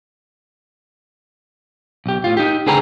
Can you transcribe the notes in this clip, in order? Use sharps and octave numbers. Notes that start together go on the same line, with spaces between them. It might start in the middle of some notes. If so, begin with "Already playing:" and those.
B1 G4
A2 F4
D#4 G4
C#2 D3 G#4 B4 G5 A#5